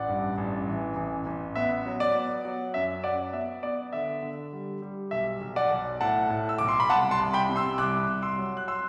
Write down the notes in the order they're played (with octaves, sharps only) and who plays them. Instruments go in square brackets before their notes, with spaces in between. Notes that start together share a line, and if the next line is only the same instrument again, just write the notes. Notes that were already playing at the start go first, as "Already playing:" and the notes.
Already playing: [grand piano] A1 D5 F#5
G2
A1
E3
A1
A1
B3 E5
F#3
D5
B3
F#3
F#2 E5
F#3 D5 F#5
B3 E5
B3 D5
D3 E5
D3
G3
G3
B1 E5
B1
D5 F#5
B1
A2 F#5 A5
A2
E6
B1 D6
C6
B5
C2 F#5 A5
A5 C6
C2
G5 B5
C3
C6 E6
C2 D6 F#6
C2
C6 E6
F#3
F#6
C6 E6